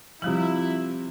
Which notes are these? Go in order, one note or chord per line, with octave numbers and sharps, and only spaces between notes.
C3 F3 G3 E4 F4 F#7